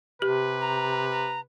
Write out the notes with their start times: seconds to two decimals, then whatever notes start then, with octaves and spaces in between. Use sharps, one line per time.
0.22 C3 G4 B4
0.61 A#5
1.11 A#5